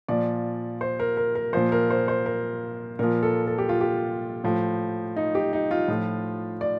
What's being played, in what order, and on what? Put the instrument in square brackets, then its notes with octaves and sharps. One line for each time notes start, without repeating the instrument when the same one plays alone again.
[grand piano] A#2 F3 D5
C5
A#4
A#4
A#4
A#2 F3 C5
A#4
C5
C5
A#4
A#2 F3 A#4
A4
A4
G4
F4
G4
A2 F3
D#4
G4
D#4
F4
A2 F3
D5